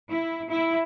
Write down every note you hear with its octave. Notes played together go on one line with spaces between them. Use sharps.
E4
E4